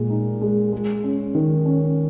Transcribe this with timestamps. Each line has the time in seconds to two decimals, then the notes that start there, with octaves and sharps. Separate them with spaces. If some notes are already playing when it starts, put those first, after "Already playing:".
Already playing: A#2 G#3
0.10 D#4
0.41 G#3
0.73 G#3
1.04 C#4
1.35 D#3
1.66 C#4